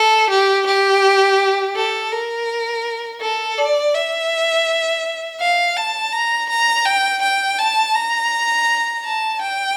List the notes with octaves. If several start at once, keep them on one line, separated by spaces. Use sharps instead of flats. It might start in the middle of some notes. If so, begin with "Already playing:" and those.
Already playing: A4
G4
G4
A4
A#4
A4
D5
E5
F5
A5
A#5
A#5
G5
G5
A5
A#5
A5
G5